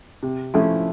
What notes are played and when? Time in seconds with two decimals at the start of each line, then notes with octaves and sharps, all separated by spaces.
0.23 C3
0.54 F3 A3 C#4 E4